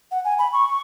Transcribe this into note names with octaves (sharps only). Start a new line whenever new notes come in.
F#5
G#5
B5
C#6